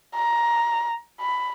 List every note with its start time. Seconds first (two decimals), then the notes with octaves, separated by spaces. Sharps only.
0.15 A#5
1.20 B5